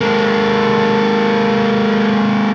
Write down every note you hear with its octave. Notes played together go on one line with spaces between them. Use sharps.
G#3 A#3